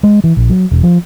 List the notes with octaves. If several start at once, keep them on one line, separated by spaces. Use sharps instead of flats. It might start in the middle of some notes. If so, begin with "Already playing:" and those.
G#3
E3
A#1
F#3
E1
F3